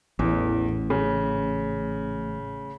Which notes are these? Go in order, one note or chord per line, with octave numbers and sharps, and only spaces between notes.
A1 E2
C#3